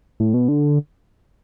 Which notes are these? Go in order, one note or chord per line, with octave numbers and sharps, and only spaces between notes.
A2
B2
D3